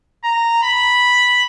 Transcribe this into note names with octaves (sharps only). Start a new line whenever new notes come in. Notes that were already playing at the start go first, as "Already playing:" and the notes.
A#5
B5